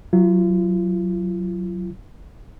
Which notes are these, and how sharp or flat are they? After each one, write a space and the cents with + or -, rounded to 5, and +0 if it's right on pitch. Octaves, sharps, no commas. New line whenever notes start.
F#3 +0 F4 -40